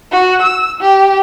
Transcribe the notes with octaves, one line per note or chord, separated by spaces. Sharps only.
F#4
E6
G4